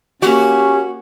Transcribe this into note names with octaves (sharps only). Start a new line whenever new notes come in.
A#3 C#4 F#4 G4